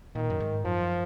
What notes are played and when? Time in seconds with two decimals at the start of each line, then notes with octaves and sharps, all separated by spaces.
0.15 A#2 D#3
0.30 F#2
0.40 G#2
0.65 F#2 F3